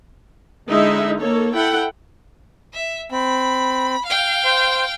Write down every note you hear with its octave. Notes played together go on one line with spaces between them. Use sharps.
D3 G#3 D#4 E4 E5
A#3 A4 C#5
E4 A4 F#5 G5
E5
C4 B5
F5 G5
C5